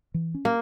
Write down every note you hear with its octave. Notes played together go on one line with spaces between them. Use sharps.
E3
C#4
A#3